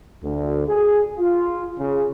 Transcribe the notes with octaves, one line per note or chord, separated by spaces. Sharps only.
D2
G#4
F4
C#3